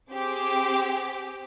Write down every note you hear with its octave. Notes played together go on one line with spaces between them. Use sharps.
C4 G4 G#4 D6